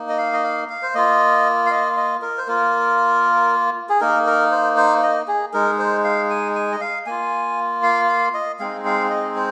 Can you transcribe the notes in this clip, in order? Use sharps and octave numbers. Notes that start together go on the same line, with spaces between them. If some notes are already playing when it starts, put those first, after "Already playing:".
Already playing: A#3 D#4
D#5
F5
D#5
F5
F5
C5
A#3 F4 D#5
F5
D#5
D#5
A#4
C5
A#3 F4 A#4
G#4
A#3 D#4 A#4
A#4
C5
C5
D#5
G#4
G#3 D#4 A#4
C5
F5
G#5
G#5
D#5
F5
A#3 F4 G#5
F5
F5
D#5
G#3 C4 D#4 F5
F5
D#5
C5